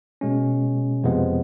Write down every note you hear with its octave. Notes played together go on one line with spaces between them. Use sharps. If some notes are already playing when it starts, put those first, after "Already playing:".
B2 G#3 C#4
F2 C3 F3 G#3 B3